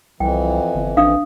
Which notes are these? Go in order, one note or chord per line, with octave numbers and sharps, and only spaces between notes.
C2 F2 E3 G5
G1
A1 D4 F5 D#6